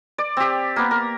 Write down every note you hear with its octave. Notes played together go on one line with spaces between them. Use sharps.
D5
C4 G4
A#3 B3
A#4